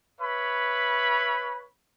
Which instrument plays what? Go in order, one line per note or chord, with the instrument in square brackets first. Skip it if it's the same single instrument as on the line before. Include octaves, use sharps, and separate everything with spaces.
[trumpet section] B4 C#5 E5 B5